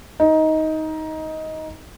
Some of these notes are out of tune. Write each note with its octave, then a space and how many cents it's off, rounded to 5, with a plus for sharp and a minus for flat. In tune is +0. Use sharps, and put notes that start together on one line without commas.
D#4 +15